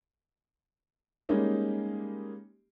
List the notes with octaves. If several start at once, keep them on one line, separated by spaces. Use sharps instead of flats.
G3 G#3 A#3 C#4 D#4 G4